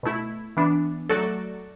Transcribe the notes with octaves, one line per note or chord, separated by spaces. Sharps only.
B2 A3 E4
E3 B3 D4
F#3 A3 F#4 A4 D5